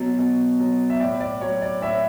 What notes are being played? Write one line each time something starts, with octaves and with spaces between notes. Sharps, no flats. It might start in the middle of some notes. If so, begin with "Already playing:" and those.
Already playing: B2 F#3
B2
F#3
E5
A2 D5
D5
F#3 C#5
D5
A2 C#5 E5